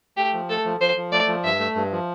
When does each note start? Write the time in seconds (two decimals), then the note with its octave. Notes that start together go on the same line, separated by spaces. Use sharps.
0.17 A3 G4
0.33 F3
0.49 A3 A4
0.65 F3
0.81 F3 C5
0.97 F3
1.12 A3 D5
1.28 F3
1.44 G2 E5
1.59 A3
1.75 G2
1.92 F3